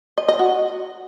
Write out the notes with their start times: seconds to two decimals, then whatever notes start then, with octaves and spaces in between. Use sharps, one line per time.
0.18 D#5
0.28 D#5
0.39 F#4